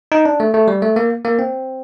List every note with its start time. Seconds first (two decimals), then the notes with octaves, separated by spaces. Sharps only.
0.12 D#4
0.25 D4
0.40 A3
0.54 A3
0.68 G3
0.82 A3
0.96 A#3
1.25 A#3
1.39 C4